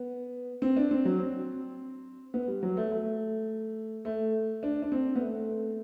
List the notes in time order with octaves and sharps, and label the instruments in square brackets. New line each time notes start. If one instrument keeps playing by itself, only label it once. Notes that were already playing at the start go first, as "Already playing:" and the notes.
Already playing: [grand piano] B3
C4
D4
C4
F#3
C4
B3
G3
F#3
A3
A3
A3
D4
D4
C4
B3
A3